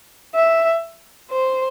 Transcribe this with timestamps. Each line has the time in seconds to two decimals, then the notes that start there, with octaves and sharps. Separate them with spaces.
0.34 E5
1.31 C5